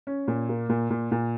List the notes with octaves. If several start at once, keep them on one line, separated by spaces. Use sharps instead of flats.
C#4
A#2
A#3
A#2
A#2
A#2